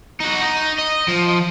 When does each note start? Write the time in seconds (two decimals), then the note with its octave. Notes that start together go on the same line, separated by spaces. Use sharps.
0.21 D#4 F#4
0.43 D#4
0.79 D#5
1.08 F3